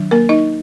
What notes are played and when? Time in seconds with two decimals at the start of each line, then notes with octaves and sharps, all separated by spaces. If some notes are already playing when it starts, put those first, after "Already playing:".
Already playing: D#3 F#3 D4
0.11 A#3 A#4
0.29 D#4 D#5